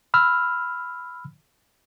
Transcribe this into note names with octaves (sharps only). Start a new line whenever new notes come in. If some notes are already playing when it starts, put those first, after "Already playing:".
B5 E6 F6